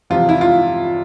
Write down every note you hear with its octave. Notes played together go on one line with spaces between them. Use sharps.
E2 C3 F3 F4
E4
F4